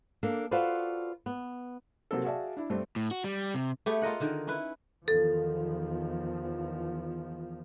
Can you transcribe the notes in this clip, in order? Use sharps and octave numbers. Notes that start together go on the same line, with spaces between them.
A#3 D4 A4
F4 F#4 A4 B4 C5 D5
B3
C3 F#3 A#3 C4 A4
F#4 G#4 D5 E5 F5 A5
D4 E4
G2 G3 A3 C4
A2
F#4
G3
C3
A3 B3 G4 G#4
F4 A#4 D#5 F#5
D3 D#3
C#4 E4 B4
E2 D#3 F3 A4